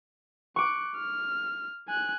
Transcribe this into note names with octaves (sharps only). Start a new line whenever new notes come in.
C#6 D6 F#6
F6
G#5 F#6